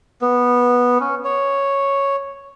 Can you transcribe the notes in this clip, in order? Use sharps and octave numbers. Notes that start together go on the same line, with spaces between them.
B3
C#4
C#5